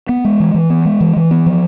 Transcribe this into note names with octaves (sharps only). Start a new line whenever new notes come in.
B3
G#3
E3
E3
B3
G#3
E3
E3
B3
F3